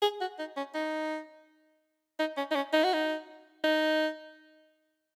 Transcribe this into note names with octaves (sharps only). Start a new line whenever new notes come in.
G#4
F#4
D#4
C#4
D#4
D#4
C#4
D#4
C#4
D#4
F#4
D#4
D#4